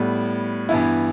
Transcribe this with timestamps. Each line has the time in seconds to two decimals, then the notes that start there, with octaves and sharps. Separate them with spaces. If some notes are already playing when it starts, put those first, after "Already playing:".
Already playing: A2 G3 B3
0.69 G2 E3 B3 E4